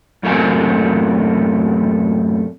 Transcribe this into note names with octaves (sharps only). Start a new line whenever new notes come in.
F#2 A2 A3 A#3 C4 G#5